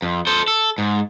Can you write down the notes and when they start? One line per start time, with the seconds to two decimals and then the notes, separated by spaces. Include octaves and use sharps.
0.02 F2
0.27 A4 C5
0.48 A4
0.78 G#2